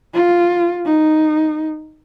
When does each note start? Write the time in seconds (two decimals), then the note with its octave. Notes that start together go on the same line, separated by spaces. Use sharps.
0.14 F4
0.85 D#4